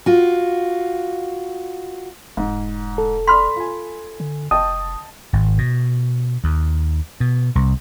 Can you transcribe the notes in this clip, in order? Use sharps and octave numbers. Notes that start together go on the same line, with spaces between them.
F4 F#4
E1 G#2
A4
D5 B5 C6 F6 B6
F4 G#5
D3
F1 D#5 G5 A5 D#6
G#1
B2
D#2
B2
C2